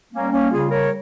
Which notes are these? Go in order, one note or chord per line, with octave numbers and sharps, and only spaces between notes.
G3 A#3 C#4
A#3 C#4
C#3 F4 G#4
A#4 C#5